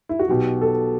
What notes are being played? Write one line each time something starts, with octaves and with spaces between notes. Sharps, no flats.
E4
F#4
B1 B2 G4
A4